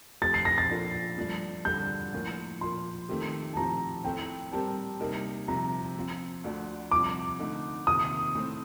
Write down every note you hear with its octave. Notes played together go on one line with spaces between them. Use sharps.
F3 A3 C4 G4 A6
C7
A#6
A6
F3 A#3 D4 F4 A4
G2 F3 A3 D4
G2 D3 G3 D4 A4 G6
A2 F3 A#3 F4
A#2 F3 A#3 C6
D#3 A3 C4 G4
A5
A2 F3 C4 G4 A#5
A2 A3 C4 G5
G3 C4 G4 A#4 A5
C3 G3 A#3 D#4 A#4
C2 C3 F3 A#5
F3 C4 F4
D2 D3 F3 A3 D4
C2 C3 F3 D6
D3 A3 D#4
C3 D#3 A#3 F4 D#6
A2 A3 C4